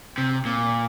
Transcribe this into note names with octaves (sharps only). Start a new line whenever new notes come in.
C3
A#2